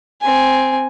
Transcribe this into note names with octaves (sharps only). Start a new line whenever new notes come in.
C4 G#5